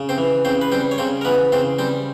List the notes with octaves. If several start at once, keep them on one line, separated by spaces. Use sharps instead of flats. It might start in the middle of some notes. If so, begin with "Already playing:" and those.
Already playing: C#3
C4 C5
E3
C#3 C4 C5
B4
G3 C4 C5
C#5
C#3 C4 C5
A#4
E3 B3 B4
C#3 C4 C5
G3 C4 C5